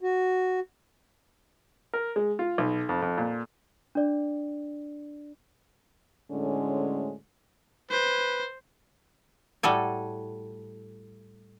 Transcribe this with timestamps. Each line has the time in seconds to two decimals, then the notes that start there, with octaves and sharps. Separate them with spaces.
0.01 F#4
1.93 A#4
2.16 G#3
2.39 F4
2.58 B1
2.89 F2
3.02 F2
3.18 A#2
3.95 D4 D5
6.32 D2 A2 D3 G#3 C#4
7.91 B4 C5
9.63 A2 G3 F#4 A4 G#5